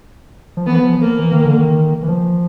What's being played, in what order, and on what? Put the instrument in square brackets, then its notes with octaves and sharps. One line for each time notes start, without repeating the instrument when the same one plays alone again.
[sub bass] F3
[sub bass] E3 [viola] B3
[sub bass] F3
[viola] A#3
[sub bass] E3
D#3
D3
D#3
E3
F3